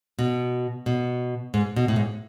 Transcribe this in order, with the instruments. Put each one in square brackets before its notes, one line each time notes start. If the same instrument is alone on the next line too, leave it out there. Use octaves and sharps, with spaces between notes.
[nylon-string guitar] B2
B2
G#2
B2
A2
G#2